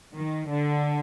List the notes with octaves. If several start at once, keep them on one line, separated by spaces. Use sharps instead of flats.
D#3
D3